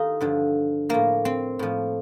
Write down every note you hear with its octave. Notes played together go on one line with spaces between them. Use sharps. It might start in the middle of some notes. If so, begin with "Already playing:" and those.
Already playing: D#3 D#4 F4 G4 A4
G2 D3 F3
A2 F3 A#3
C4
A2 F3